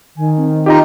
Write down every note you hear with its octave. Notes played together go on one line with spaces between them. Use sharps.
D#3 G#5
C4
D#4 F4 G4 D#5 A#5